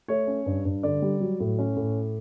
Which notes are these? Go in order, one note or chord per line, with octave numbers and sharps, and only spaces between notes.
A3 C#5
C#4
G2
G2
D3 D5
G3
F#3
A2
C#4
A2